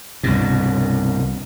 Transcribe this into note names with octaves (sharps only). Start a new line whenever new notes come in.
C2 G2 B2